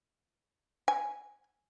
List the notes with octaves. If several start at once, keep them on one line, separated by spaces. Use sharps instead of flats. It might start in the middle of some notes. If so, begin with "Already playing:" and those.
G#5